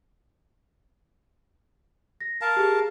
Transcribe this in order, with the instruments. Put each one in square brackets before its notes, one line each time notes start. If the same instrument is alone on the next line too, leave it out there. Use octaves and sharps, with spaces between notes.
[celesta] A#6
[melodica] A#4 F5 A5
[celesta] G4 G#4